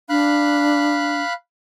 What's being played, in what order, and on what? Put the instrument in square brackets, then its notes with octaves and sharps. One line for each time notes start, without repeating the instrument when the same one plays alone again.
[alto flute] D4 [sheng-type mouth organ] F5 B5 F#6